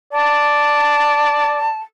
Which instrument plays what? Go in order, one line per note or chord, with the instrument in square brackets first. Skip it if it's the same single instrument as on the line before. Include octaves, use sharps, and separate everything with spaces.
[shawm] D5 [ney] A5